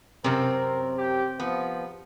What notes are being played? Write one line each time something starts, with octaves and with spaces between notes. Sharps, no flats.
F#2 C3 C4 A#4
G4
F3 B3